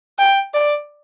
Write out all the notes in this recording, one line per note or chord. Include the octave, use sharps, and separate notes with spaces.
G5
D5